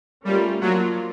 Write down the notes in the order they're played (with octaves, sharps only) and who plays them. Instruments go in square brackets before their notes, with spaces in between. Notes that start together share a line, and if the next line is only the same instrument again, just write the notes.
[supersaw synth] G3 [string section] A3 C#4 F4 A#4
[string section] F3 A#3 D4 F4 [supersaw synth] F#3